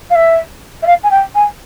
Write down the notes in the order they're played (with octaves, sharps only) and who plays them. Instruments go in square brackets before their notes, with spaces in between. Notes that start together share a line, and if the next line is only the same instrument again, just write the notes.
[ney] F5
E5
E5
F5
G#5
G5
G#5